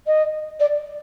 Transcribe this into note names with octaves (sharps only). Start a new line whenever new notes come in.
D#5
D5